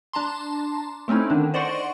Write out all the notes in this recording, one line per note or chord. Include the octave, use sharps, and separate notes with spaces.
D4 A5 A#5 C6
A3 C4 C#4 D#4 E4
D3 D#3 D4
C5 D5 D#5 F#5 C6 C#6